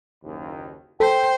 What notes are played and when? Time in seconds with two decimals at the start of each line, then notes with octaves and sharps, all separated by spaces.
0.24 F#1 D#2
1.00 A4 C5 G5